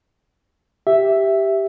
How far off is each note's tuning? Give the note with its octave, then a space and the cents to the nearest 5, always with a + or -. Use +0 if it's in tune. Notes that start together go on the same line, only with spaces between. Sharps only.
G4 -5 E5 +0